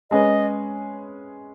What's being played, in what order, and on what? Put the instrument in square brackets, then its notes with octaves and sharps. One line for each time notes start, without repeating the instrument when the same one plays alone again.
[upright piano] G#3 C#4 G#4 B4 [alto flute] D#5